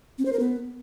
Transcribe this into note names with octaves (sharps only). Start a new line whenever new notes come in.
C4
C5
A#4
B3